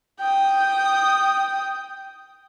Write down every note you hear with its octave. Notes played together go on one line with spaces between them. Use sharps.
G5 D#6